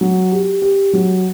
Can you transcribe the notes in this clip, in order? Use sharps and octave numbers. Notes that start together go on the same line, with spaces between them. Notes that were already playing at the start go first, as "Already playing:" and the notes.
F#3
G4
G4
F#3